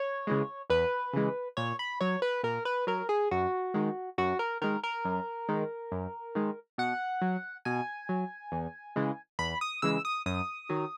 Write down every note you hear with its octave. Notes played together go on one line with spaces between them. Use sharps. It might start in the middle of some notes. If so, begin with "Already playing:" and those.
Already playing: C#5
C#3 E3 G#3
E2 B4
C#3 E3 G#3
A#2 C#5
B5
F#3 C#5
B4
A#2 A#4
B4
F#3 A#4
G#4
F#2 F#4
D#3 G#3
F#2 F#4
A#4
D#3 G#3 A#4
A#4
F#2
D#3 G#3
F#2
D#3 G#3
B2 F#5
F#3
B2 G#5
F#3
E2
C#3 E3 G#3
E2 B5
D#6
C#3 E3 G#3 E6
D#6
F#2 D#6
D#3 F#3